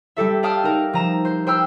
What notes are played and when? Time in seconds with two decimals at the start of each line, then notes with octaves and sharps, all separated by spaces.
0.16 G3 G4 A4 E5
0.43 D5 F5 G5 A5 D#6 F6
0.64 D#4 A#4
0.93 F3 A#5 E7
1.25 C5
1.47 C5 G5 B5 E6 F6